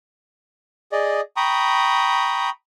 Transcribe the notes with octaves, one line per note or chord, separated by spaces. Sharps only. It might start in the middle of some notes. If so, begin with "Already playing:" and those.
G#4 D5 D#5
G5 A#5 B5 C#6 D#6